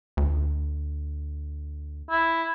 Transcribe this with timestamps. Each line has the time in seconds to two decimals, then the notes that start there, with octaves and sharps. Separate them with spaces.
0.17 D2
2.11 E4